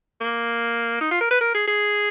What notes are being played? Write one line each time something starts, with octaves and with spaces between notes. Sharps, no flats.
A#3
D#4
F4
A#4
B4
A#4
G#4
G#4